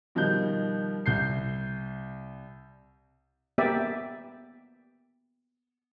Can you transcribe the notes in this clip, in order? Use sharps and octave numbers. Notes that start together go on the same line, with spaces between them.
B2 D#3 F3 G3 G6
C2 G6 C7
A#3 B3 G4 D5 E5